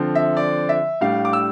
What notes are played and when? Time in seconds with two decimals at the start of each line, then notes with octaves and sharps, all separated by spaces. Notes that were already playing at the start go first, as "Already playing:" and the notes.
Already playing: D3 F3 C4
0.15 E5
0.37 D5
0.69 E5
1.01 A2 G3 D4 F5
1.25 D6
1.33 E6